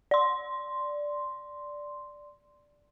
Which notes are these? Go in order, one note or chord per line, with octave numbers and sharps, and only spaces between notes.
D5 C6